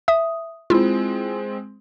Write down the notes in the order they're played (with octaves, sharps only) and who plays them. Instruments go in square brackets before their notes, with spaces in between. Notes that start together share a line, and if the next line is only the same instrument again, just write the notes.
[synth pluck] E5 D#6
[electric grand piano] G#3 C4 [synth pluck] E4 F4